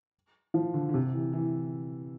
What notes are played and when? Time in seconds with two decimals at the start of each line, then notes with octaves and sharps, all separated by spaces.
0.54 F3
0.74 D3
0.89 D3
0.94 C3
1.13 E3
1.33 E3